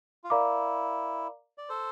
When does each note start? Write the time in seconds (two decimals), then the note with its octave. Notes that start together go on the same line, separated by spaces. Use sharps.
0.24 F4
0.30 E4 A#4 D5 F5 A#5 D6
1.58 D5
1.69 A4 C5